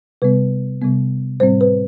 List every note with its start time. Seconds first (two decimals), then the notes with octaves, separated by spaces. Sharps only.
0.22 C3 G3 B3 B4
0.81 C3 G3 B3
1.40 A2 G3 C4 C5
1.61 B4